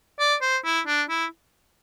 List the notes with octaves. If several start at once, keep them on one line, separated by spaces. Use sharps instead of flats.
D5
C5
E4
D4
E4